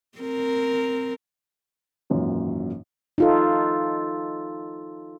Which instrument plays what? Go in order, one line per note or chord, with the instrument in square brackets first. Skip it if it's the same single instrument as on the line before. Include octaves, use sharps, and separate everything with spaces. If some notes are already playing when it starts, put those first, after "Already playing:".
[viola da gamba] C4 A#4
[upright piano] G#1 F#2 A#2 E3 F#3
[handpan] D#4 F4 A4